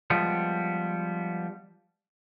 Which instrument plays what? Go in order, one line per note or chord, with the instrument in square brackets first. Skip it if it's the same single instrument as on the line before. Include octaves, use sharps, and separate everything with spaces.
[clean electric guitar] F3 G3 G#3 B3